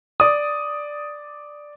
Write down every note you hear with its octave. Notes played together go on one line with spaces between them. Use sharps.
D5 D#6